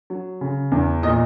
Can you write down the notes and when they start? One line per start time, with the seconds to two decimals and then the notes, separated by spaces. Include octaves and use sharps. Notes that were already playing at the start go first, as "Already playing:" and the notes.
0.10 F#3
0.41 C#3
0.72 E2
1.03 A#2 D#5